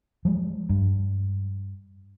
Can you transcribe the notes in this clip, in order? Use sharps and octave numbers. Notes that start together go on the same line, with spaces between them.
F3 G3 G#3
G2